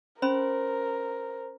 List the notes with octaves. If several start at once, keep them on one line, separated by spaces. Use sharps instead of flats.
C#4 A#4 C5 B5